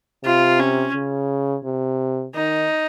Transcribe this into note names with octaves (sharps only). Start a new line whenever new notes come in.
C3 F4
C#4
C#3
C3
D#3 D#4